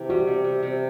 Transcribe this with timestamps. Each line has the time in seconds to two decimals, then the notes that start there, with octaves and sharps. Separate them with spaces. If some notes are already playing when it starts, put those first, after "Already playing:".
Already playing: C3 E3
0.09 G3 F#4
0.27 C3
0.44 C3
0.63 C3